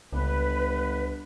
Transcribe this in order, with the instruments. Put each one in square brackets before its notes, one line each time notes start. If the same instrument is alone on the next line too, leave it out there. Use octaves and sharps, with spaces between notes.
[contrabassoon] G1 [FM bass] C#2 [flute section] B4